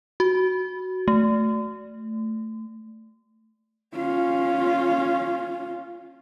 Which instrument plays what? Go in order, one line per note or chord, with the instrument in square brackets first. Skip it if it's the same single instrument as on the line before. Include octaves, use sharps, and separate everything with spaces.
[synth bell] F#4
A3
[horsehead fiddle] C#4 F4